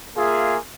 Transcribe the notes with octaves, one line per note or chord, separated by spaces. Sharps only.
A#3 F4 G#4 E5